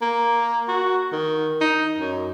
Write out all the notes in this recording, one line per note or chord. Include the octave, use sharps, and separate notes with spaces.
A#3
F#4
D#3
D#4
F#2